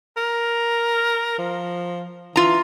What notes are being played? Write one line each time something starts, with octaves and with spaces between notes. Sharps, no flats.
A#4
F3
E3 F4 A#5